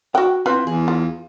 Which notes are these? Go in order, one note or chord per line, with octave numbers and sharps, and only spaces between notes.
F#4 F#5 G5
C4 E4 F4 B4
E2 G#4
F4